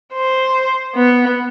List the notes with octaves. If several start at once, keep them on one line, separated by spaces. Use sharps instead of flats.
C5
B3